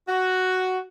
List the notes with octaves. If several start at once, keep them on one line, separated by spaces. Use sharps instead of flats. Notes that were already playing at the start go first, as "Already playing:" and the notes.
F#4